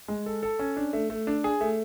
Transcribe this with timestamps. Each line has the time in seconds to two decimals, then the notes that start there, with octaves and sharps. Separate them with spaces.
0.08 G#3
0.26 A4
0.42 A4
0.59 C#4
0.77 D4
0.93 A3
1.10 A3
1.27 D4
1.44 G#4
1.61 A3